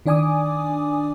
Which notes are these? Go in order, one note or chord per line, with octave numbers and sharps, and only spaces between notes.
D#3 D4 D5 G#5 D6 D#6